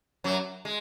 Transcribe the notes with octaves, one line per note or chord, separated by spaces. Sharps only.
F#2 F#3
G#3